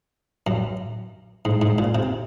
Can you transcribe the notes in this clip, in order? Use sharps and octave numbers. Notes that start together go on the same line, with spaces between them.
F#2
G#2
G#2
A#2
C3